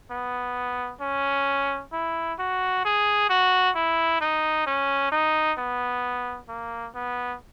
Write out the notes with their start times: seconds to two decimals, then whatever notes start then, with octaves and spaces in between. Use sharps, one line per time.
0.11 B3
1.01 C#4
1.92 E4
2.39 F#4
2.85 G#4
3.29 F#4
3.75 E4
4.21 D#4
4.66 C#4
5.12 D#4
5.58 B3
6.48 A#3
6.95 B3